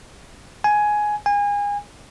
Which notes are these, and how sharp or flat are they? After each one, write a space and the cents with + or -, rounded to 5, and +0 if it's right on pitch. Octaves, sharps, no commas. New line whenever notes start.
G#5 +10
G#5 -30